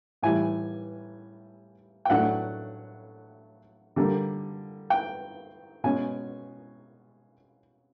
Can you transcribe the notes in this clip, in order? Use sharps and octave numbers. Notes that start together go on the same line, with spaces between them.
A2 E3 G3 G#5
G5
A2 F#3 A3 D4 F#5
D3 G3 A#3
G5
B2 G#3 C#4 G#5